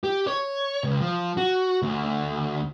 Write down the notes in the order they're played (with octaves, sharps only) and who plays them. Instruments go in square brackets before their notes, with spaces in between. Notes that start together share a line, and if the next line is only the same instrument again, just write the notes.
[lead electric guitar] G4
C#5
C#2
F3
F#4
D2